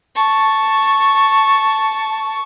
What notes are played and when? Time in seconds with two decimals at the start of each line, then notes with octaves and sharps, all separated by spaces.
0.16 A5 C#6